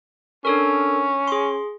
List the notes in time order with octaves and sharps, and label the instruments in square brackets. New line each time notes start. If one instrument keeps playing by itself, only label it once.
[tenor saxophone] C#4 [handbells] D4 A4 A#4
[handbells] G#4 C6